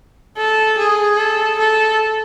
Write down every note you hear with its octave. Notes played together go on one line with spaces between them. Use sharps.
A4
G#4
A4
A4